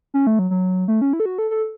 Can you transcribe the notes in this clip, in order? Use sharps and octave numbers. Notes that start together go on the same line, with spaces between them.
C#4
A3
F#3
F#3
A3
C#4
E4
A4
F#4
A4
A4